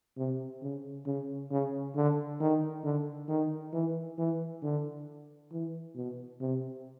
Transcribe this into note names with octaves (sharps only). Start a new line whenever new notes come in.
C3
C#3
C#3
C#3
D3
D#3
D3
D#3
E3
E3
D3
E3
B2
C3